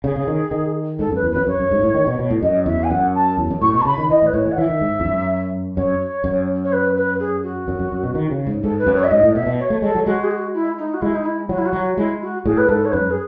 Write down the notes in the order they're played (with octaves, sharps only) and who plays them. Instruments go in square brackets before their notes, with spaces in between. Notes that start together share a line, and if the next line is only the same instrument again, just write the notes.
[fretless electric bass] C#3 [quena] G#4
[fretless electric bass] C#3
D#3
D#3
[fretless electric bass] G#2 [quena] A4
[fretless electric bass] F#2 [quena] B4
[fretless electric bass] E2
[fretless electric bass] F#2 [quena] B4
[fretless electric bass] F#2 [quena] C#5
[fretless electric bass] F#2
G#2
A2
D#3
B2
B2
A2
[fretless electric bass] F#2 [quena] D#5
[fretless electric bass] E2 [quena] E5
[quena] G#5
[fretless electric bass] F#2 [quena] F#5
[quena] A5
[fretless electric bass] E2
F#2
[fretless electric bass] A2 [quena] C#6
[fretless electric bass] B2 [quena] C#6
[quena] A5
[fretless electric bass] C#3 [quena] B5
[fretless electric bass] D#3
[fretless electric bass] E3 [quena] D#5
[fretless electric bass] A2
[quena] B4
[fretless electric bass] A2 [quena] C#5
[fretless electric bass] E3
[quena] F#5
[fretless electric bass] E3 [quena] E5
[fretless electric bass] D#3
G#2
E2
F#2
[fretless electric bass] F#2 [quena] C#5
[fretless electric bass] F#2
[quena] C#5
B4
B4
G#4
F#4
[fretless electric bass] F#2
F#2
F#2
B2
D#3
C#3
G#2
[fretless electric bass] G#2 [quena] A4
[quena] B4
[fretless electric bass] F#2
[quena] C#5
E5
[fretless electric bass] G#2 [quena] D#5
[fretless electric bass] A2
[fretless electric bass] B2 [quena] E5
[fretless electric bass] B2
[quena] C#5
[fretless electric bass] A3
[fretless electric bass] G#3 [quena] A4
[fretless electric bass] F#3
[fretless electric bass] G#3 [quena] F#4
[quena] G#4
F#4
E4
D#4
F#4
[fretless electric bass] G#3 [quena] E4
[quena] D#4
E4
[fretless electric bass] F#3 [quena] F#4
[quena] E4
F#4
[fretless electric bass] F#3
[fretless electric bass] G#3 [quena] E4
[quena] F#4
[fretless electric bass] A2 [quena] G#4
[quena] B4
[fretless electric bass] G#2 [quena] A4
[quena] C#5
[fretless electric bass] F#2 [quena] B4
[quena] G#4